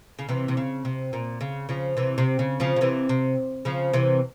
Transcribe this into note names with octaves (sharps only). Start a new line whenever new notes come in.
C#3
C3 E3
C3
C#3
C3
A#2
C#3
C#3 F3
C3 E3
C3
C#3
C#3 F3
C#3
C3 E3
C3
C#3 F3
C3 E3